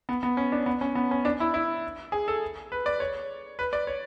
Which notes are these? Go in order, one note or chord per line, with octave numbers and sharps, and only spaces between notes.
B3
B3
C#4
D4
B3
C#4
B3
C#4
D4
E4
E4
G#4
A4
B4
D5
C#5
B4
D5
C#5